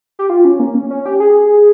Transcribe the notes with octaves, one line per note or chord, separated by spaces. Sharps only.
G4
F4
C#4
A#3
C#4
C#4
G4
G#4